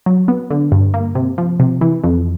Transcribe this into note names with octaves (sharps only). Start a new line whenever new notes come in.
F#3
B3
D3
G2
A#3
C3
F3
C3
E3
F2